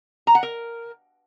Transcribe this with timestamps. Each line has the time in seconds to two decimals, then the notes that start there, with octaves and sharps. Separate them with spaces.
0.27 A#5
0.35 F#5
0.43 A#4